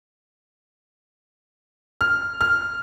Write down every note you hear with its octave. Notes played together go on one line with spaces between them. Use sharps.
F6
F6